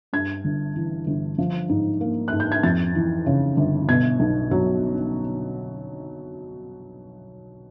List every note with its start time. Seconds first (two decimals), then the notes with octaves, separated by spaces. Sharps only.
0.13 G2 G#6
0.44 G1
0.76 E3
1.07 G1
1.38 F3
1.69 G#2
2.01 A#3
2.28 G#2 F#6
2.40 G6
2.52 G#6
2.63 F2 A6
2.95 E3
3.26 C#3
3.57 G1
3.89 B2 G#6
4.20 B1
4.51 F#3